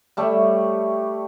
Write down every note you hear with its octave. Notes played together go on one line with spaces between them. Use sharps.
G3 A3 C#5 E5